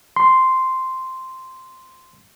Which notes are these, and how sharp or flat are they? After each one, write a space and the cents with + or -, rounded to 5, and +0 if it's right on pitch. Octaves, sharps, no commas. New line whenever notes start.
C6 -5